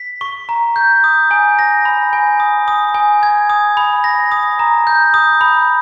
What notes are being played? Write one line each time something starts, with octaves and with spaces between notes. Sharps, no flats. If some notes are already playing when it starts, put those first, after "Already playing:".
Already playing: B6
C#6
A#5
G6
D#6
G#5
A#6
B5
G#5
D#6
D#6
G#5
G#6
D#6
B5
A#6
D#6
A#5
G6
D#6
B5